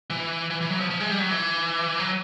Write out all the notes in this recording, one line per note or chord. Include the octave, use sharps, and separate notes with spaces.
E3
E3
E3
F#3
F3
F3
G#3
G3
F#3
E3
F#3